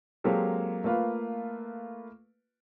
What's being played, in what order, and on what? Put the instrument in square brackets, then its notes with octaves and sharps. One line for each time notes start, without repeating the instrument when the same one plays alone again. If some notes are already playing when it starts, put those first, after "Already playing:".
[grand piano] F#3 G#3 A#3 C4 G4 A4
A3 A#3 F4 A4 B4